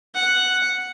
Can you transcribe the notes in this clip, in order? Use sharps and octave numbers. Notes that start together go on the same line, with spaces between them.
F#5